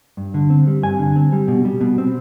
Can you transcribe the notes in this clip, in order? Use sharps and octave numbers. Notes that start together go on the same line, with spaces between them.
G2
D3
C4
G3
G2 G#5
D3
C4
G3
B2
G3
B2
C4